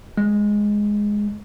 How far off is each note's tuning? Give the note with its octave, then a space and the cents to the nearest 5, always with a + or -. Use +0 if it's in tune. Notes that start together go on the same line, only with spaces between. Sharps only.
G#3 +0